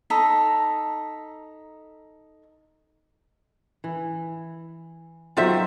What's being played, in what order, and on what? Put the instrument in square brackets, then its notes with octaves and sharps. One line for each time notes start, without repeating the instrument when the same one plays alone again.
[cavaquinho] D#4 A4 A#5 B5
[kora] E3
[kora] D#3 F#3 [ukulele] F4 C5 E5